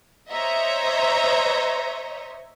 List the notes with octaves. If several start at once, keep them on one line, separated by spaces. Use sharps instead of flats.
C5 C#5 D#5 E5 A#5